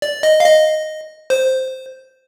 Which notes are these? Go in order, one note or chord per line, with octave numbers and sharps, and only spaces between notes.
D5
D#5
F5
D#5
C5